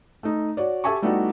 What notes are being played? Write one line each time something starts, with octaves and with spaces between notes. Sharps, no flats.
A3 D#4
F#4 C#5 D5
G4 A4 E5 G#5 A5 C#6
G3 A3 B3 D#4 E4 F#4